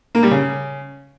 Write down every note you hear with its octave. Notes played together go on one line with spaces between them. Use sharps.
A#3
G3
C#3